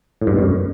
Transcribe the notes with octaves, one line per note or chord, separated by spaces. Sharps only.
A2
G2
B2
F#2